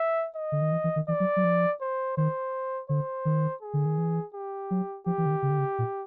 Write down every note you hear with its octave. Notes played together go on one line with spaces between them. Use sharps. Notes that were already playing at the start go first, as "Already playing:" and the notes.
Already playing: E5
D#5
D3
D#3
E3
E3
D#3
E3 D5
F#3
F#3
F3
C5
D#3 C5
D3 C5
D#3
G#4
D3
D#3
E3
G4
F#3
F3 G4
E3
D3
D#3
C#3
D3
C#3
A#2